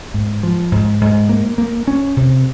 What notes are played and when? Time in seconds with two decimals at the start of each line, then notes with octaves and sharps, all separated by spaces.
0.14 G#2
0.43 F3
0.72 G#2
1.01 G#2
1.29 A#3
1.58 A#3
1.87 C#4
2.17 C3